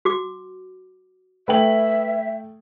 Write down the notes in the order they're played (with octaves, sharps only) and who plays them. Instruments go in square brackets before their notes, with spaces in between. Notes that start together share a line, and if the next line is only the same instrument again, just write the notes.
[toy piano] F#4 D6
[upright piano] A3 G5 F#7 [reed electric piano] B4 [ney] E5